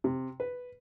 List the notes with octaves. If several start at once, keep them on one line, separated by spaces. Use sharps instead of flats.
C3
B4